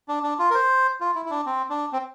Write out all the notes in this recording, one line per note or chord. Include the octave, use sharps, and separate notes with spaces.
D4
D4
F4
A#4
C5
F4
E4
E4
D4
C4
D4
C4